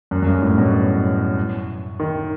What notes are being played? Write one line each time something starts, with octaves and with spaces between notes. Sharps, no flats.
F#2
F#2
G2
A2
B2
D#3